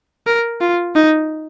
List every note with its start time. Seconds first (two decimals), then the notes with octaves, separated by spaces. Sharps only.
0.27 A#4
0.61 F4
0.95 D#4